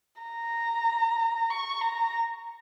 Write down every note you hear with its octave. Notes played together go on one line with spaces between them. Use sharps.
A#5
C#6
A#5